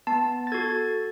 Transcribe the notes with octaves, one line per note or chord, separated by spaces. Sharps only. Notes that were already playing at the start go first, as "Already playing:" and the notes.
B3 A5
A6
F#4 A4 G#6